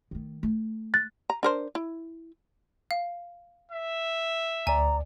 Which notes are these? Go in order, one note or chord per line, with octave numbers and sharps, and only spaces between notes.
D#3 A3
A3
F#6 A6
A#5
D4 A#4 C5
E4
F5
E5
D2 D5 G#5 A#5